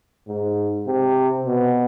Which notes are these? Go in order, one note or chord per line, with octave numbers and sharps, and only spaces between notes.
G#2
C3
B2